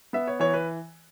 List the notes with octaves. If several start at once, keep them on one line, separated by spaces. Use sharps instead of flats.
B3 E5
C#5
E3 C#5
B4